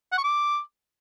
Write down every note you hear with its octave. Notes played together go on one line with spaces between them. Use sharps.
F#5
C#6
D6